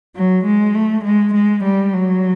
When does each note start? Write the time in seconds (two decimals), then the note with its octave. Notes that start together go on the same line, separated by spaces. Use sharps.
0.16 F#3
0.45 G#3
0.75 A3
1.05 G#3
1.34 G#3
1.64 G3
1.94 F#3